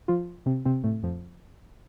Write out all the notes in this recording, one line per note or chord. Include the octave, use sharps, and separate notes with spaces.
F3 F4
C3 C4
C3 C4
A2 A3
F2 F3